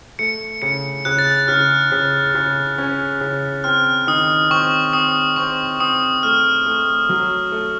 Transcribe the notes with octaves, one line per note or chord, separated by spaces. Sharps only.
A3 C#7
C#3 C#7
C#3 F#6
A6
F#6
C#3 F6
C#3
C#3
C#4
C#3
C4 F6
D#3 D#6
C4 C#6
C4 D#6
C4 C#6
C4 D#6
A3 F6
A3
F#3
A3